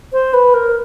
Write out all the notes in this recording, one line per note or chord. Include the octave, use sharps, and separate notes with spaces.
C5
B4
A#4